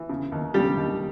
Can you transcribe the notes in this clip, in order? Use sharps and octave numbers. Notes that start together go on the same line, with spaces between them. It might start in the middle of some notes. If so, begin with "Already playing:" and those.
Already playing: E3
C#3
D#2
C#3 G3 G4
D#2